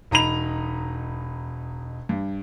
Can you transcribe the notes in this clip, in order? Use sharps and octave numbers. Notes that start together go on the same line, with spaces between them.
E1 D#4 A#5 B5 F7
G2